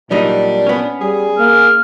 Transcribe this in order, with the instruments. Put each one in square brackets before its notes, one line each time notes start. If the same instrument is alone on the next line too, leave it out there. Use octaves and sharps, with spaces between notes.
[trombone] A#2 [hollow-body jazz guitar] F#3 G3 D#4 [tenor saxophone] D4
[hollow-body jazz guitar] B3 C#4
[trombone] G3 [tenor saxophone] G#4
[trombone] A#3 [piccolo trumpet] F6